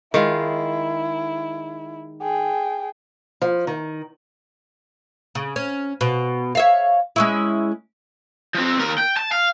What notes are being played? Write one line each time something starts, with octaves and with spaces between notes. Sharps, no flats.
D#3 G#3 E4 F4
G#4 G5
F3
D#3
C#3
C#4
B2
C#5 E5 F5
G#3 C#4 E4
F3 C4
D#2 A#4
G5
A5
F5